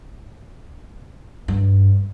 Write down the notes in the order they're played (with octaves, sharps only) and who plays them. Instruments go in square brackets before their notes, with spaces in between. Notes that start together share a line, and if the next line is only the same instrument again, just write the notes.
[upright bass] G2